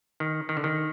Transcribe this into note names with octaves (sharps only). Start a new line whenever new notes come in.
D#3
D#3
D3
D#3